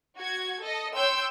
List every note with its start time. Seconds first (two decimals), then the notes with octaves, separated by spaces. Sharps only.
0.18 F#4 G#6
0.63 A4 D#5
0.97 C#5 G5 C6 E6 G6